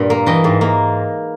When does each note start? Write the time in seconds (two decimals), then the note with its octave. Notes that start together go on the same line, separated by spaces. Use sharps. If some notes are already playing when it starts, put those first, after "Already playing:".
Already playing: G2 A#2 G3
0.10 A#3
0.26 E3 D#5 G5
0.44 G#2
0.61 A#3